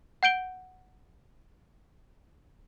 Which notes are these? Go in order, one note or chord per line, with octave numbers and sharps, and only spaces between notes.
F#5 G6 D7 G7